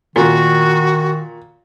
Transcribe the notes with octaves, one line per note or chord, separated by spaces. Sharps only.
A#2 D#3 F#4